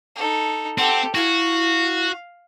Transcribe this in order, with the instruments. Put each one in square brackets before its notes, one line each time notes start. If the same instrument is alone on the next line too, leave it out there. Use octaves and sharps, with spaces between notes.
[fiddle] D#4 A4
[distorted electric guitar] C4 [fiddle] G4 A4 [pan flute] F#5
[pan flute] E4 [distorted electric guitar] F#4 [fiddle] F5